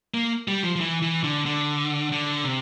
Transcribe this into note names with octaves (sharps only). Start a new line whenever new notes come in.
A#3
G3
F3
F3
E3
E3
D3
D3
D3
C3